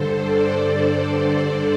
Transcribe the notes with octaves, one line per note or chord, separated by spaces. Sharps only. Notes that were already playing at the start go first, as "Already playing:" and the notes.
Already playing: G2 D3 A4 C5
D5
C5